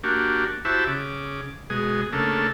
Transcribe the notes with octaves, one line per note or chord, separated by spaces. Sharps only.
A#3 D4 F#4 G4
E4 F#4 G4 C5 E5 A5
C#3 D6
B2 G#3 G#4
C#3 A3 A#3 D4 A4